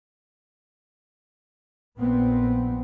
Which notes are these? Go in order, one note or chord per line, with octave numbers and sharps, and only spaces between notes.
A#1 A#2 B3 C4